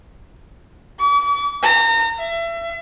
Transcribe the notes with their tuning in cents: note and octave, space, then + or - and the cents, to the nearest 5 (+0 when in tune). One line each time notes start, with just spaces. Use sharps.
D6 -45
A#5 -35
E5 +30